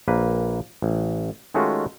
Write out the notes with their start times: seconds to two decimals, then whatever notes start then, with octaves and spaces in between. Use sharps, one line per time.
0.08 A#1 A#3 B4
0.82 A1
1.54 D#3 G#3 A3 C#4 F4 F#4